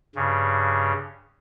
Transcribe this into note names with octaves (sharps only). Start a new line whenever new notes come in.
G2 C#3